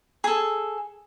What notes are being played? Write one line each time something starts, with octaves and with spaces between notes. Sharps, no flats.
G#4 A4